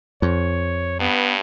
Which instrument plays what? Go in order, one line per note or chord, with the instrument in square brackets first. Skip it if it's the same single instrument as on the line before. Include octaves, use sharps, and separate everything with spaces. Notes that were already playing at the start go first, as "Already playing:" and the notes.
[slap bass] F2 [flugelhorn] C#5
[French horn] G2 [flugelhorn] B3